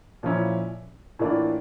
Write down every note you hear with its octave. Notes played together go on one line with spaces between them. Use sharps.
A#2 F3 C#4 E4
A2 E3 A#3 D4 F4